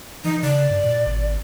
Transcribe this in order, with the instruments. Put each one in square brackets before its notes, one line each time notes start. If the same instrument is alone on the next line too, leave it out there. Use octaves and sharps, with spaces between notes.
[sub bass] E3 [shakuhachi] D#4
[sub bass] C#3 [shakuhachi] D5
[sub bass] G2
A#2
G#1